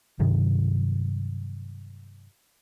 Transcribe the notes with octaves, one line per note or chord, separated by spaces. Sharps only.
G2 C3 D#3 F#3